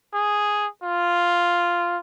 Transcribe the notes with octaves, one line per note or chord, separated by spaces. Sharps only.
G#4
F4